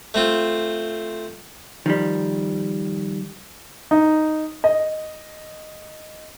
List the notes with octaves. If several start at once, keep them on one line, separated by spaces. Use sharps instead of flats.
A3 C4 F4
D#3 F3 G3
D#4
D#5